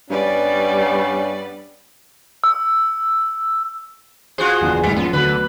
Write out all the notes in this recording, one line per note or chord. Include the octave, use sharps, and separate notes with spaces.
G2 G3 B3 C#4 B4 D5
E6
F4 F#4 G#4 C5
F#1 E2 D4
F#1 G#2 E3 F#3
F#2 F3 B3
D2 D3 F#3 B3 B4